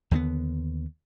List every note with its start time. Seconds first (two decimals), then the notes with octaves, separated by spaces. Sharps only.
0.11 D#2 D3 G#3 B3